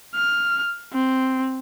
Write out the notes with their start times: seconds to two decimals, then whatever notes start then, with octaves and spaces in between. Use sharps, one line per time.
0.15 F6
0.93 C4